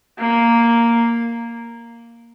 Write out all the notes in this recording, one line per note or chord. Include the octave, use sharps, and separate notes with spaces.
A#3